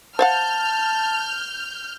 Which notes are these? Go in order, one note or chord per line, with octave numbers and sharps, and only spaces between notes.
C5 F5 F#5 A5 F6 G6